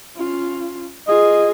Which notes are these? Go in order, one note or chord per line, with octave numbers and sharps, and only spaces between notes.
C#4 F4
F4 G#4 D#5